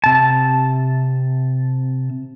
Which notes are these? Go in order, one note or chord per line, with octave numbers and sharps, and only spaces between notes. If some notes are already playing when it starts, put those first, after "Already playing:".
C3 A5